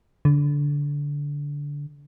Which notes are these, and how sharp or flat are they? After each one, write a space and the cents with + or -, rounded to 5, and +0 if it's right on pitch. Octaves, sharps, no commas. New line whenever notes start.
D3 -20